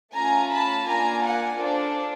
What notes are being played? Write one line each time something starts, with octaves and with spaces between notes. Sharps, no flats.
A3 C#4 F4 G#5 A#5
A5 B5
A#3 D4 F4 G#5 A#5
F#5 G#5
D4 F4 A4 C5 D5